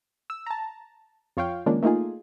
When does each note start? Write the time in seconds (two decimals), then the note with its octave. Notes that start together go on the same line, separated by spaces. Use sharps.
0.30 E6
0.46 A5 A#5
1.37 F2 F4 C#5 F5 G5
1.66 D#3 F3 G#3 A#3 C#4 D4
1.83 A3 A#3 D#4 F4 G#4